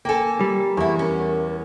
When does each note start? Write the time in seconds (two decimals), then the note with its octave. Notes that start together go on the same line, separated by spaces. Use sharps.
0.05 A#3 A4 G5 G#5
0.41 G3
0.77 E2 A#3 E4 C#6
0.99 C#4 A#4